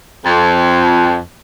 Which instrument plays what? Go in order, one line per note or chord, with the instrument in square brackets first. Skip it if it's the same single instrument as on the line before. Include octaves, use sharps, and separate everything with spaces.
[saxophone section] F2